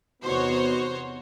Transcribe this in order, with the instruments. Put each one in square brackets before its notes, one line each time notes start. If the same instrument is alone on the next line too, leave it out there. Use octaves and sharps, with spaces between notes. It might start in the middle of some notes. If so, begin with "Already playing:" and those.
[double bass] E2 C3 [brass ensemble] B3 D#4 F#4 [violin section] C5 C#5